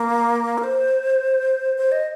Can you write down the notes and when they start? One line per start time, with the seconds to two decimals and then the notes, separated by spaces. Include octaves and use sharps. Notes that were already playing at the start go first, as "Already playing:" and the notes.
Already playing: A#3
0.58 A#4
0.63 C5
1.78 C5
1.92 D#5